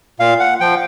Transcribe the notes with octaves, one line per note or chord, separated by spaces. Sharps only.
A#2 F5
F#5
F3 G5